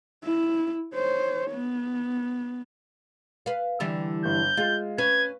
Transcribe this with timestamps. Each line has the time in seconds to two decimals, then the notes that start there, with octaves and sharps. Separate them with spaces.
0.24 E4
0.95 C5 C#5
1.51 B3
3.46 B4 F5
3.80 D3 E3 G3
4.25 G1 G6
4.57 G#3 F4
4.98 C#4 B4 G#6